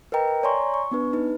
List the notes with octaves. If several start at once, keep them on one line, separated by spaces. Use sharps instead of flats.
A#4 B4 D#5 G5 A#5
C#5 D5 G#5 A#5 C6 C#6
C#6
B3 D4 B4
D#4 B4